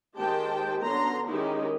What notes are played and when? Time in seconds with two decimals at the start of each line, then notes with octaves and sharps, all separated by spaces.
0.16 D#3 G#3 G4 C5 G5 A5
0.82 D3 F#3 B3 C#4 A#5 C6
1.28 D#3 G#3 C#4 D#4 E4 G4